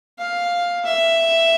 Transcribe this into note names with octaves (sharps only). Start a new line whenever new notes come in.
F5
E5